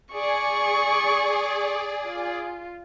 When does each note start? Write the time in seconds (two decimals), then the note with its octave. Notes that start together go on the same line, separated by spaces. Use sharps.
0.15 G#4 D5 C#6
2.07 F4